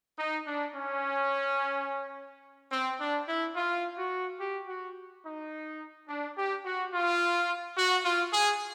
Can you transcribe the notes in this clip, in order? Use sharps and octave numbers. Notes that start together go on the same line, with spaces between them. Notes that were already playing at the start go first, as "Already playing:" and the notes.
D#4
D4
C#4
C4
D4
E4
F4
F#4
G4
F#4
D#4
D4
G4
F#4
F4
F#4
F4
G#4